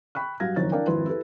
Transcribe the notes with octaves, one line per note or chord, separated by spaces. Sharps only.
G5 B5 C#6 F#6
B1 G2 F#4 F5 G#6 A#6
F#1 F2 D#3 C#5 A6
D4 E4 A#4 D5 F5 G5
G#1 F2 E4 B4 C6
E4 G4 A4 B4